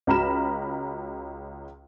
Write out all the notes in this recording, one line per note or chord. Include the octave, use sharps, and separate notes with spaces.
C#2 F#4 A#5 B5 F6 E7